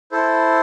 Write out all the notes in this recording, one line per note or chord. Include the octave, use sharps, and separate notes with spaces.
E4 A4 C5